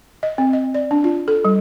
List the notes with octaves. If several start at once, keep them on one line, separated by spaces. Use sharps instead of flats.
D#5
C4
D#5
D5
D4
F4
A4
G3